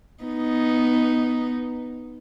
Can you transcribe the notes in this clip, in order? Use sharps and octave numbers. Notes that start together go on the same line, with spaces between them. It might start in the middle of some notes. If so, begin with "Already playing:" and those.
B3 D#4